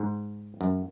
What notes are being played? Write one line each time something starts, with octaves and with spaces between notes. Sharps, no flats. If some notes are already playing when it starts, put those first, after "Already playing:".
Already playing: G#2
F#2